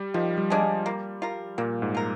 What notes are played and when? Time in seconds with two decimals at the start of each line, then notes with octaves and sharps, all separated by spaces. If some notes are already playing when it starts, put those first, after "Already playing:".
Already playing: G3
0.14 D#3 F3
0.38 G3
0.50 G#3 D4 G#4
0.63 G3
0.86 A#3
1.22 F4 A#4
1.58 A#2 A#3
1.82 G#2
1.95 F4 A#4